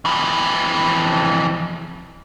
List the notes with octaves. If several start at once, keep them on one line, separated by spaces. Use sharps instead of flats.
F2 E3